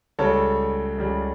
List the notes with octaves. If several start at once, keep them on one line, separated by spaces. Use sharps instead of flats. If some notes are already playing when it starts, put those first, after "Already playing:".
C#2 C#3 G3 A4 C#5
C#2 C#3 G3